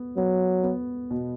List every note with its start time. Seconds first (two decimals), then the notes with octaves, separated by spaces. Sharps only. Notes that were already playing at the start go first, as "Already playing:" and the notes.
Already playing: B3
0.17 F#3 B3
0.63 B3
1.11 B2